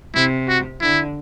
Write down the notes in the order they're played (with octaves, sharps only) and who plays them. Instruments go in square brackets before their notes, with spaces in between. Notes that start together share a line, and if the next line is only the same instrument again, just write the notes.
[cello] C3 [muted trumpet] E4
[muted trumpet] F#4
[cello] D3 [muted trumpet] E4